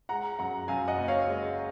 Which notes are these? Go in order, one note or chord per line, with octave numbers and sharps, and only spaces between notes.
G#3 F#5 A#5
F#2 F#5 A#5
F#2 F5 G#5
D#5 F#5
F#1
C#5 F5
G#3